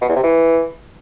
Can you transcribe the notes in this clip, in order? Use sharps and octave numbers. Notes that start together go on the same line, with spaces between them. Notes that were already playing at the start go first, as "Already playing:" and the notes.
B2
E2
C3
E3